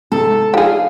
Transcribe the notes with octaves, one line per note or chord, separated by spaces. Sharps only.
G#2 C3 A4
F3 D4 D#4 G4 G#4 F5